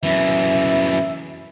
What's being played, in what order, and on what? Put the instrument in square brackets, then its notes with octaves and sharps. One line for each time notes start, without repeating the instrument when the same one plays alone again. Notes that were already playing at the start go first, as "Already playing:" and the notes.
[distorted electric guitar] F#2 E3 [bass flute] E5